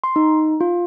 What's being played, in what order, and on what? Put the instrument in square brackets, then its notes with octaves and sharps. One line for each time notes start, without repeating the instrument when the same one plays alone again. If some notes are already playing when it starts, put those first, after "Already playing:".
[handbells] C6
D#4
F4